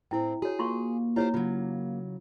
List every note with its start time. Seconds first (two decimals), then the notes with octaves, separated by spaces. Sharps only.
0.11 A2 C4 E4 G5
0.42 F#4 G#4 C#5
0.59 A#3 F4 C6 C#6
1.16 E4 F4 G4 C5 C#5
1.34 C#3 F#3 F4